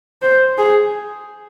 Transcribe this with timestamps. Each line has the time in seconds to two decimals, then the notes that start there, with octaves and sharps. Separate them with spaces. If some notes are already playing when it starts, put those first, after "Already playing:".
0.22 C5
0.58 G#4